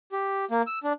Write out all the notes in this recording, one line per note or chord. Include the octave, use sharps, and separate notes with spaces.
G4
A#3
E6
D4